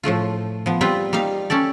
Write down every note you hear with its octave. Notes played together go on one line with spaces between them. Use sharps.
A2 F3 A3 F4
F3 B3
G3 C4 F4 B4 G5
G3 A#3 D#4 F5
C#4 G4 A4 D5